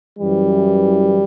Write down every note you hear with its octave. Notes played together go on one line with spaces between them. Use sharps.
F#2 E3 G3